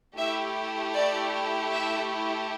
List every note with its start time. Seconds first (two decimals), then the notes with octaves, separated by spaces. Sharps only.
0.16 A3 E4 G4 E5
0.94 D5
1.71 E5